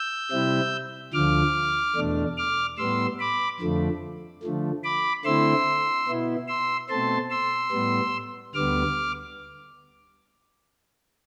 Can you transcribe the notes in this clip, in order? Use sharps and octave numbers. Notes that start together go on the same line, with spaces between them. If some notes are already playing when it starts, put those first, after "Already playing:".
Already playing: E6 G6
C3 G3 C4 E4
D2 D3 F3 D6 F6
E2 B2 A3 D4
D6 F6
A2 G3 B3 C6 E6
B5 D6
F2 D3 F3 A3
D3 F3 A3
B5 D6
D3 A3 C4 E4 C6 E6
B2 B3 E4
C6 E6
B2 A3 C4 A5 C6
C6 E6
A2 G3 B3
D2 D3 G3 B3 D6 F6